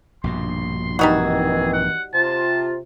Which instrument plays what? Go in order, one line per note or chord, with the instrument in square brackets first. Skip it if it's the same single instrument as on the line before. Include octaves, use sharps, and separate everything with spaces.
[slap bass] A#1 G2 B2 [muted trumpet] C6
[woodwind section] D#3 E3 C4 [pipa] G3 D#4 F#4 [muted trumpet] G#4
[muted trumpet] F#5
[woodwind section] C3 F4 [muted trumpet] A5